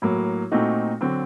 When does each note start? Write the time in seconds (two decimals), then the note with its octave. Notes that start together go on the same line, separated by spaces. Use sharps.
0.02 A2 F#3 A#3
0.52 A#2 A3 C4 D#4 F#4
1.01 D3 F#3 C4 F#4